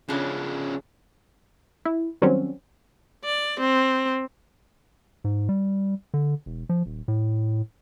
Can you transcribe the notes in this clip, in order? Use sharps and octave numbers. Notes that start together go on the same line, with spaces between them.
C#3 F3 C#4 D4 E4
E4
D#3 F#3 G3 C4 C#4
D5
C4
G#2
G3
D3
E1
F3
D#1
A2